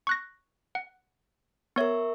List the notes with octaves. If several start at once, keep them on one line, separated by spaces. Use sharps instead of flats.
C#6 F#6 A#6
F#5
B3 A#4 C#5 E5 C#6